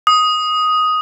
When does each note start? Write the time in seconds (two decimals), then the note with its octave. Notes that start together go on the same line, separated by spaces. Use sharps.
0.07 D#6